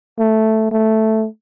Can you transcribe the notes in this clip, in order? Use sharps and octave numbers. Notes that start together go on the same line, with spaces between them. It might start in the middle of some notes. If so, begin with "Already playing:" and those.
A3
A3